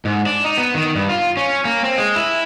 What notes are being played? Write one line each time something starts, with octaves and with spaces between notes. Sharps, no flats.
G#2
D4
D#4
B3
D#3
G2
F4
C#4
A#3
C4
G#3
E4